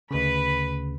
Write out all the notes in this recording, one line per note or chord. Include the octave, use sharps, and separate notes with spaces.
D2 C#3 B4 B5